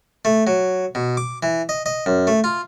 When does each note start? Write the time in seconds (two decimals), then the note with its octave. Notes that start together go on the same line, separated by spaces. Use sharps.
0.25 A3
0.47 F#3
0.95 B2
1.17 D6
1.43 E3
1.69 D#5
1.86 D#5
2.06 F#2
2.27 A3
2.44 F4